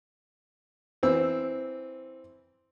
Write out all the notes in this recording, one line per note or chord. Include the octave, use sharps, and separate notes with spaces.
E3 C4 E6